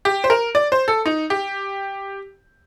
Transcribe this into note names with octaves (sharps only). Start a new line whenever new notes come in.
G4
C5
A#4
D5
C5
A4
D#4
G4